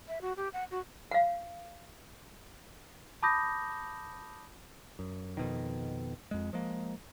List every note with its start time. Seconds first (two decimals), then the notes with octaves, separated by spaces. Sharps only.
0.08 E5
0.21 F#4
0.37 G4
0.53 F#5
0.71 F#4
1.11 F5 F#5
3.23 A5 B5 D6 D#6 G6 A#6
4.99 F#2
5.37 F2 B2 D#3
6.31 F2 G#3
6.53 F3 G#3 A#3